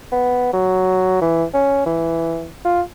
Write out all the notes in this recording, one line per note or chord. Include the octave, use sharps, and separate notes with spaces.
B3
F#3
E3
C#4
E3
F4